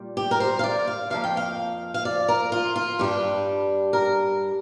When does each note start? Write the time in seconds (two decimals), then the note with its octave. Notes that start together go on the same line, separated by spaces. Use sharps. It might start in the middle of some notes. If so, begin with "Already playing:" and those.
Already playing: A#2 G3
0.17 G4
0.31 A#4
0.40 C5
0.59 F5
0.64 D5
0.87 F5
1.10 F2 F3 A#3 F5
1.24 G5
1.37 F5
1.94 F5
2.05 D5
2.28 A#4
2.52 F4
2.76 F4
2.99 G2 G3 D4 G4
3.93 A#4